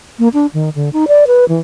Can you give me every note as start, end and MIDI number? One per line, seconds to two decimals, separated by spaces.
0.19 0.28 58
0.34 0.46 62
0.54 0.70 51
0.75 0.90 50
0.93 1.05 63
1.08 1.24 74
1.27 1.45 71
1.49 1.60 52